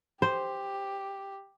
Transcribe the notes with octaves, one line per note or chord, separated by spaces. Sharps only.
G4 C5